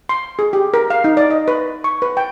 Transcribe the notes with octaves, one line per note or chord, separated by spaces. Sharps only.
C6
G#4
G4
A#4
F5
D#4
D5
D#5
B4
C#6
B4
G5